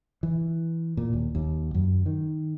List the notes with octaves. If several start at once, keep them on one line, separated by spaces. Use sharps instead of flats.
E3
A#2
D#2
D#2
F#2
D#3